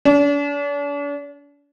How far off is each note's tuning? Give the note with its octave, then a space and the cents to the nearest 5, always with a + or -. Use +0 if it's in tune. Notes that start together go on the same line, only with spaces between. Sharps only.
D4 -40